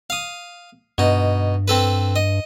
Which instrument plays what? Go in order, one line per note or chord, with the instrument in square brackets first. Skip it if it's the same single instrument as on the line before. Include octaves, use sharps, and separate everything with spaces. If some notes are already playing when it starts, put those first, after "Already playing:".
[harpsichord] F5 D#6
[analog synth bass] G2 [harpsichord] B2 D#4
[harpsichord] C4 A4 B4
D#5